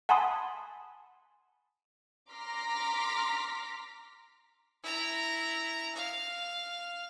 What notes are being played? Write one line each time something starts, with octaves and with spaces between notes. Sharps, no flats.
F#5 G#5 A5 B5 C6 D#6
A#5 C6 D6 F6 A#6 B6
E4 A#5
F5